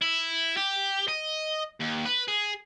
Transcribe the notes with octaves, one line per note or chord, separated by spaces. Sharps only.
E4
G4
D#5
D#2
B4
G#4